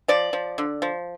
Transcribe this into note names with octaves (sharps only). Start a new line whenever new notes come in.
F3 D5
F3
D3
F3